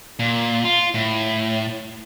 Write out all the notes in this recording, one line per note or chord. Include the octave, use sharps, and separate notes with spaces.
A#2
F4
A2